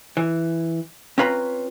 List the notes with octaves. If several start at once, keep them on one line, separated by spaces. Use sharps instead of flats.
E3
C4 C#4 F4 B4 A#5